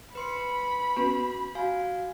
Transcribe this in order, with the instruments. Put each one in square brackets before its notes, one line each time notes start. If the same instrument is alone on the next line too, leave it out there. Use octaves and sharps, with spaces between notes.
[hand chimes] B4 C6 C#7 [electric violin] B5
[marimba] B3 C#4 B4 [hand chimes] F#4
[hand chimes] F#4 F5 G#5